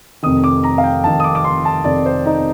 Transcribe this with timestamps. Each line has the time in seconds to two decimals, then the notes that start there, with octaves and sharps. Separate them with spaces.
0.23 F1 F2 D#3 D#6
0.44 D6
0.64 A#5
0.78 F5
0.84 G5
1.04 F1 F2 D#3 A5
1.20 D#6
1.24 D6
1.35 D6
1.44 C6
1.65 A5
1.84 F1 F2 D#3 D5
2.06 C5
2.26 D#4